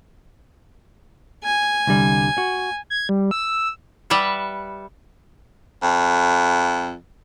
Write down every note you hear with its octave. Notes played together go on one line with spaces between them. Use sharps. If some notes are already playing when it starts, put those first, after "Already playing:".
G#5
C2 D3 G3
F#4
G#6
G3
E6
G3 B4 E5 F#5
F2